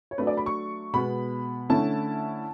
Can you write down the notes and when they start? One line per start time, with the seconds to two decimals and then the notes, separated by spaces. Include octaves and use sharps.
0.11 C#5
0.18 F#3 A3 D4 B4
0.27 D5
0.37 B5
0.46 C#6
0.93 B2 G#3 B3 B5
1.70 D3 A3 C#4 E4 A5